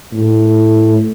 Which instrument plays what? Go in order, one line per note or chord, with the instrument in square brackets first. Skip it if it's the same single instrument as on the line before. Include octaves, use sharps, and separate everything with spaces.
[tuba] A2